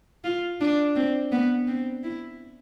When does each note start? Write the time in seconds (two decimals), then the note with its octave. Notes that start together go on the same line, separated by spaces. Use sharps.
0.24 F4
0.60 D4
0.96 C4
1.32 B3
1.67 C4
2.04 E4